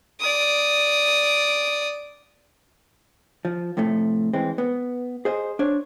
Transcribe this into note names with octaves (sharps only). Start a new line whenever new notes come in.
D5 D#6
F3
F2 A2 C3 A3
E3 G#3 C4
B3
G#4 C5 D#5
D4 C5 C#5